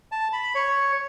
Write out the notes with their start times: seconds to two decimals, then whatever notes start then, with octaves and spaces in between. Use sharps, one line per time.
0.12 A5
0.33 B5
0.55 C#5